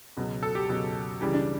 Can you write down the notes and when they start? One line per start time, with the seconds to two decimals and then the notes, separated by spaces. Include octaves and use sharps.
0.17 C#2 B2 F#3
0.43 A4
0.55 G4
0.69 C#2 B2 F#3
1.21 C#2 C#3 E3 G3 G4
1.34 D4